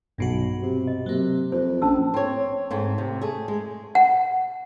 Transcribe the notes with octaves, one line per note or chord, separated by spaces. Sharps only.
B1 G2 B2 F#4
C3
D#5
C3 F#3 A#3
F2 C5
A#1 C#4 A5 E6
C4 C#5
G#2 A3 C4
C3
A3 G#4
G#3
F#5